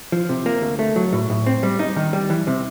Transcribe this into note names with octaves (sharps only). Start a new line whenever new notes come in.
F3
C3
A#3
D2
A3
F#3
A2
A2
C4
G3
D#4
D#3
G3
E3
C3